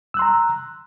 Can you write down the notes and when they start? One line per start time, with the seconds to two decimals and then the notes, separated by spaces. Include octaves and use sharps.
0.14 E6
0.17 F#6
0.19 C6
0.22 A#5